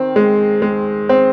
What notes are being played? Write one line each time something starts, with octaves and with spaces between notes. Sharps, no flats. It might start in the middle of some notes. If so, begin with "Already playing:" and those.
Already playing: D#3 C4
G#3
G#3
C4